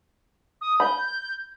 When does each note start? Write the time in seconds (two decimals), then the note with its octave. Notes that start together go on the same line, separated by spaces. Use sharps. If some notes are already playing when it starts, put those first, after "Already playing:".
0.61 D#6
0.80 B5 G6